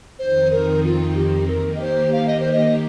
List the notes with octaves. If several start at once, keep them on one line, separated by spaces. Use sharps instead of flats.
F2 D#3 C4 D#4 C5
A#4
F4
G4
D#3 A#3 G4 A#4
D#5
C5
F5
D#5
C5
D#5